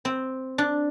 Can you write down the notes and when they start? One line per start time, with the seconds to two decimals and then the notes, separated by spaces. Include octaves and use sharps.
0.05 C4
0.58 D4